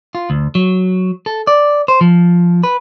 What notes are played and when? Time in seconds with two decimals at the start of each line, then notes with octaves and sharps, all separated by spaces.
0.15 F4
0.30 D2
0.55 F#3
1.26 A4
1.47 D5
1.88 C5
2.01 F3
2.63 B4